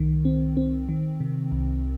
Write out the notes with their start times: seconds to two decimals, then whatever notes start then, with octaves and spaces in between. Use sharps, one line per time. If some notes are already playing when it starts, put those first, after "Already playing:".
Already playing: C2 D#3
0.25 C4
0.57 C4
0.89 D#3
1.20 C3
1.52 C2